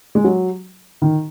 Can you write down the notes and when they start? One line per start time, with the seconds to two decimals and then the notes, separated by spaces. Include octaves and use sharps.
0.15 G#3
0.24 F#3
1.02 D#3